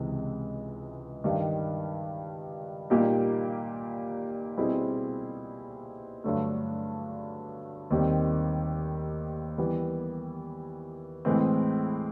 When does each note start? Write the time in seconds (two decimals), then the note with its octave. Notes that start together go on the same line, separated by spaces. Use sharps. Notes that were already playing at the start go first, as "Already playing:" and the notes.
Already playing: C#2 C3 E3 G#3
1.24 G2 D#3 G3
2.90 A#2 G3 A#3 D#4 G4
4.58 B2 G3 C4 E4 G#4
6.24 G2 D3 F#3 A3
7.90 D#2 D#3 G3 C4
9.58 E3 G3 B3
11.25 A2 E3 G#3 C4